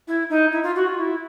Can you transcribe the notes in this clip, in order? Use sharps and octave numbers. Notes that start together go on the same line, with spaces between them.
E4
D#4
E4
F4
F#4
F4
E4